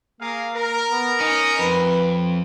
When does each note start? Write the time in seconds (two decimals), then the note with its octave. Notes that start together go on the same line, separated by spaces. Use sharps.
0.20 A#3 G#4 A#4 F5
0.54 A#4
0.91 B3
1.20 C#4 D#4
1.59 F2 B4